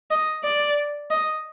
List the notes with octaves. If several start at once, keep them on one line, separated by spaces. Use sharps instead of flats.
D#5
D5
D#5